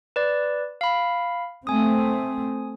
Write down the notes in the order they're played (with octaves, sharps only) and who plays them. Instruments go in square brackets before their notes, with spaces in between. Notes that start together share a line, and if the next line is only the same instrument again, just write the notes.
[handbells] B4 D5
F5 B5
[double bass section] A3 C4 [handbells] G#5 D#6